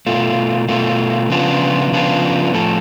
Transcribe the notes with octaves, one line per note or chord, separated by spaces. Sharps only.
B2 A3 F4
B2 A3 F4
C#3 F3 B3 D4 F4
C#3 F3 B3 D4 F4
A2 F3 A3 F4 A4